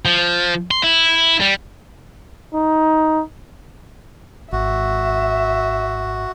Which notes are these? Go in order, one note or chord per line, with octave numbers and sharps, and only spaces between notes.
F3
C6
E4
G3
D#4
G#1 F#4 E5